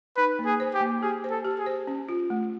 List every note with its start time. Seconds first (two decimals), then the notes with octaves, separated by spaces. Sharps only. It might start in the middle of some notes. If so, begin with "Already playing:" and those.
0.17 D#4 B4
0.39 A#3
0.46 G#4
0.60 C5
0.74 G4
0.81 A#3
1.02 G4 G#4
1.24 C5
1.31 A4
1.45 G4
1.59 G#4
1.66 C5
1.87 C#4
2.09 F4
2.30 A3